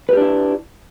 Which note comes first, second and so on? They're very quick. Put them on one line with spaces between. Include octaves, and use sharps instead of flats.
B4 G4 D4 E4